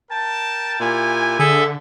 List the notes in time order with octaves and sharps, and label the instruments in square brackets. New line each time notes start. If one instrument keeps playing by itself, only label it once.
[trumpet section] A#4 G5 A5
[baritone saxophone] A#2 [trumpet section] E4 G4 G#5
[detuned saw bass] D3 [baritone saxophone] G#4 [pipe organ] A4 E5